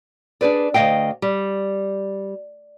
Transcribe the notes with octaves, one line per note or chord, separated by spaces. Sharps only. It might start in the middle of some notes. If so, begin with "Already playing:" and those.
D4 G#4 B4 D5
D2 E3 D#5 F5 G5
G3